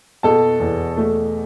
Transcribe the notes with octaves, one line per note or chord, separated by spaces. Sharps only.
B2 A4 A5
E2
A3